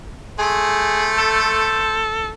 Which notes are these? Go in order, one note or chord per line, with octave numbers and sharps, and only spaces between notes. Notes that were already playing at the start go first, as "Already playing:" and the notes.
A3 G#4 C5
A4